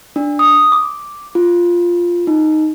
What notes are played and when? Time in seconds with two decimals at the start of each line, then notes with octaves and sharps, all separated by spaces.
0.16 D4
0.39 D#6
0.72 D6
1.35 F4
2.27 D#4